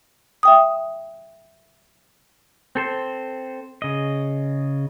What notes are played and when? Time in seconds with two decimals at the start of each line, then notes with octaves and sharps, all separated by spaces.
0.43 E5 G5 D#6
2.75 C4 A4 C5
3.82 C#3 D#5